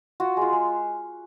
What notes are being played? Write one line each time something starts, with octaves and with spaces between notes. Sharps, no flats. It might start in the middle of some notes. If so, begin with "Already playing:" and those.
F4 F#4
G#3 F4
G#3